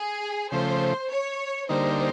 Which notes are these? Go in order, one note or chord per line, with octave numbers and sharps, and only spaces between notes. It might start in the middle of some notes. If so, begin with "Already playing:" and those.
Already playing: G#4
C#3 F3 A3 C5
C#5
D3 G3 A#3 D#4 C5